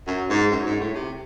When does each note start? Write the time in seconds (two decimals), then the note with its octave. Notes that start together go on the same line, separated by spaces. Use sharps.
0.07 F#2
0.30 G#2
0.52 F#2
0.66 G#2
0.81 A2
0.95 C3